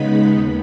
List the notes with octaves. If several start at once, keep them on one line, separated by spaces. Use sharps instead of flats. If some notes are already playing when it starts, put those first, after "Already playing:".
Already playing: C#3 G#3 B3 D#4 B5
D#2